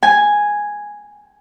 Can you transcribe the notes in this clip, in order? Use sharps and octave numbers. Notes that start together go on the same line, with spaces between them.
G#5